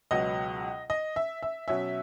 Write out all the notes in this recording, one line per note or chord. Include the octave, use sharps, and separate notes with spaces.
C#2 B2 F#3 B3 D#5
D#5
E5
E5
B2 F#3 C#4 E5